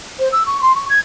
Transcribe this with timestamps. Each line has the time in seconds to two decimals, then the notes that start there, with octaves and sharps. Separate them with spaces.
0.19 C5
0.32 E6
0.46 C#6
0.61 C6
0.75 C#6
0.89 G#6